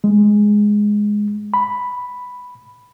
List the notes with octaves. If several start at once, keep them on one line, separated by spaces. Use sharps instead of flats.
G#3
B5